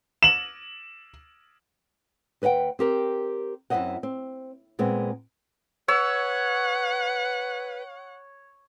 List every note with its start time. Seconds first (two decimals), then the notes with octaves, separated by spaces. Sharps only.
0.23 E7 F#7
2.42 D#2 B4 D#5 F#5 G5
2.79 C4 G4 A#4
3.70 F#2 C4 E4 C5 D#5 F#5
4.03 C4
4.79 A#2 G#3 B3 C4
5.88 B4 C#5 F#5 E6